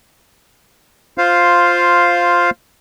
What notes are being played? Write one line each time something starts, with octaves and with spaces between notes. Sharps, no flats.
F4 C5 F5